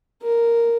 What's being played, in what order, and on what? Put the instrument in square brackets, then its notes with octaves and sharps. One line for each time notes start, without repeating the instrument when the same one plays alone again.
[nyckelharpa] A#4